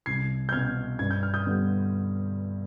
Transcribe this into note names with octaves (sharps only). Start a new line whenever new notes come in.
C2 G#6 C7
G6
B2 B3 F6 G#6
G2 G#6
G6
F6
D#6 G6
D3 G3 B3